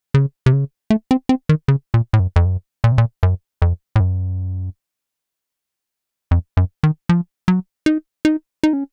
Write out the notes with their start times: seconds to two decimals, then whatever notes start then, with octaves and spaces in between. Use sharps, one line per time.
0.14 C#3
0.46 C3
0.53 C#3
0.90 A3
1.11 C4
1.29 C4
1.49 D#3
1.68 C#3
1.94 A#2
2.13 A2
2.19 F#2
2.36 F2
2.45 F#2
2.84 A#2
2.92 C3
2.98 A#2
3.23 F#2
3.62 F2
3.96 A2
4.00 F#2
6.31 F2
6.57 F#2
6.83 D#3
7.09 F3
7.48 F#3
7.86 D#4
8.25 D#4
8.63 D#4
8.73 C#4